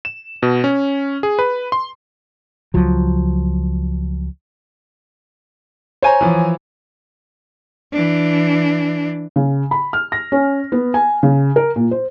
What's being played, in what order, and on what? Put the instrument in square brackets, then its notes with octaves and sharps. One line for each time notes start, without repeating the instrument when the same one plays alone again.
[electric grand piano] E7
B2
C#4
G#4
B4
C6
[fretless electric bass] C#2 F3 F#3
[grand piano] C5 [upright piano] C#5 G#5 A#5
[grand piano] E3 F3
[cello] E3 D4
[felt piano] C#3
B5
F6
A#6
C#4
B3
G#5
C#3
A#4
A#2
C5